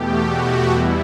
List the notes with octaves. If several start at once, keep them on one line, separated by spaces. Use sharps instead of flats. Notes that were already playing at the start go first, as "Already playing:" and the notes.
Already playing: E2 B2 A3 G4
F#4
E2 B2 G3 E4